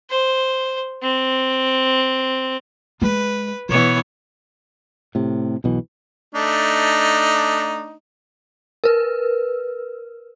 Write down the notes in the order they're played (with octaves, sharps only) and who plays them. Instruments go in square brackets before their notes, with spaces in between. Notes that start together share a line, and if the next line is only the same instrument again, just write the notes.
[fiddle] C5
C4
[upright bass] G#3 [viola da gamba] B4
[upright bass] B2 [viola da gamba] E3 B3 C#5
[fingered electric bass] A2 C3
B1 B2 E3
[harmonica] A3 D4 D#4
[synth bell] A#4 B4